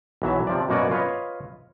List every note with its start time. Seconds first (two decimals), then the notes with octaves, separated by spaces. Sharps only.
0.22 B1 E3 F#3 E5
0.47 C3 F3 D5
0.69 F#2 B2 A#3 F#4 D5 G#5
0.91 F4 B4 C#5 D#5 F5